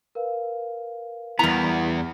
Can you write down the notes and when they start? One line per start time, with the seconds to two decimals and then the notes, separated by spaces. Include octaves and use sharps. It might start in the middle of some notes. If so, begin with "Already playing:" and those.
0.15 A#4 B4 F5
1.39 E2 E3 G3 B3 A#5